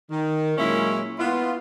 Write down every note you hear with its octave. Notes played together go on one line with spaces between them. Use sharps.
D#3
A#2 F#3 G#3 A#3 C#4 E4
B3 E4 F4